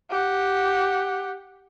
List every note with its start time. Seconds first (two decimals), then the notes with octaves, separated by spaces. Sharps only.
0.10 G4 F#5